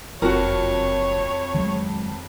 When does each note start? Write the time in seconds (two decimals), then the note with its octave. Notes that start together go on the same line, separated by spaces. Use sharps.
0.22 F#1 F2 F#4 A#4 C#5
1.54 D#3 F#3 G#3